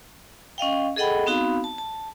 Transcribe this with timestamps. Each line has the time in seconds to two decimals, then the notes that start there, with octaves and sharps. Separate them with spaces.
0.58 C#4 D#5 F5 G5
0.96 G#4 A4 D#5 F#5 G5 B5
1.26 B3 C4 D#4 F#4 F5 B5
1.64 A5
1.78 A5